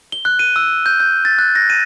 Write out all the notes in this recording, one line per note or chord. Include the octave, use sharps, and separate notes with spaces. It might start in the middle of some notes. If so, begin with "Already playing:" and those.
G7
F#6
D#7
E6
G6
G6
A6
F#6
A#6
D#7